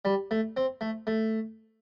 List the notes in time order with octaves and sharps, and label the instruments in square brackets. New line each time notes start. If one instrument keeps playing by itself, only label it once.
[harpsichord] G3
A3
C4
A3
A3